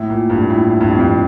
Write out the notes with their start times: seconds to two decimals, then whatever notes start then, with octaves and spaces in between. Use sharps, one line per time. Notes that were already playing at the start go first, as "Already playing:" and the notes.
Already playing: A2
0.10 A#2
0.30 G2
0.42 A#2
0.50 A2
0.70 A2
0.81 G2
0.90 F2
1.00 G2